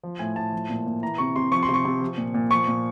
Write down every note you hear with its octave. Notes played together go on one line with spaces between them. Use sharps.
F3
A2 G#5
A2 A5
F3
A#2
A#2
E3 A#5
C3 C#6
C3 C6
F3 C#6
C6
C3
C#6
C3
F3
A#2
A#2
F3 C#6
A#2